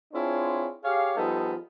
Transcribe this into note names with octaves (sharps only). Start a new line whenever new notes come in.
C4 D4 E4 F4 G#4 C#5
G4 G#4 C#5 F5
F3 G3 B3 D#4 G#4 A4